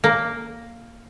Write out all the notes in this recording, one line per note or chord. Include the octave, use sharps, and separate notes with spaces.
A#3